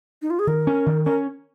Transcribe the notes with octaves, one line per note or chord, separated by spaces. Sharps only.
D#4
F4
G#4
D#3 A#4
C#4
D#3
C#4 A#4